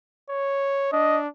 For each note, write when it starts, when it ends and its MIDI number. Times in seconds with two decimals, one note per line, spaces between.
0.30 0.90 73
0.93 1.28 62
0.93 1.18 75